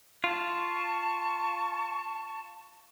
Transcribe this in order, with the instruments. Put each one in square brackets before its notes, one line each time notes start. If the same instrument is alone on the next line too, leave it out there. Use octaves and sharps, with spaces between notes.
[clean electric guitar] F4 [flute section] A5 C#6